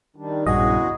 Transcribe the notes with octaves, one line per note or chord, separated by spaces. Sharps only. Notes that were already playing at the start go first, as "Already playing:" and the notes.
D#3 G3 D4
A#1 E2 G2 C#3 G#3 F#4 G#4 D#5